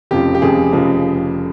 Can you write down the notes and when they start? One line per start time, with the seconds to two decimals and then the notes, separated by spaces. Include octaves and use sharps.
0.11 F1 F2 C#3 F3 G4
0.35 G4
0.41 F1 F2 C#3 F3 G#4
0.72 F1 F2 C#3 F3 G#4